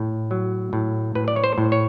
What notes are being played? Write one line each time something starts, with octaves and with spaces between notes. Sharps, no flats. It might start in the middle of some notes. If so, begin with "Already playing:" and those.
Already playing: A2
F#3
A2
A2 B4
D5
C#5
C5
A2
C#5